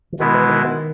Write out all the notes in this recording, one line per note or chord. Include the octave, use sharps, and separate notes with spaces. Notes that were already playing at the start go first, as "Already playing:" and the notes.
E3
B2 D#3 G#3 B3 E4
E3
D#3
D#3